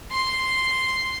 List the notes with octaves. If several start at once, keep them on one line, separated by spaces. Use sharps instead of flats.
C6